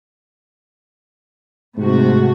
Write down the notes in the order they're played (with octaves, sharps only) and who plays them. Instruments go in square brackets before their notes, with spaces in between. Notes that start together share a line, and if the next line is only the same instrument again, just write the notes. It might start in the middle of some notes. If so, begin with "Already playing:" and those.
[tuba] G#2 [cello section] C3 A3 F#4